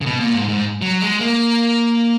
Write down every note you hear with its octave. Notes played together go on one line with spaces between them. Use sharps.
C#3
B2
A#2
G#2
G#2
F#3
G#3
A#3